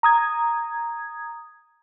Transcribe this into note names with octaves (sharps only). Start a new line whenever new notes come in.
A#5 D#6 G#6